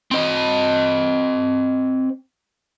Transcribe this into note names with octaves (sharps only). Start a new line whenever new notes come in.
C4 D#5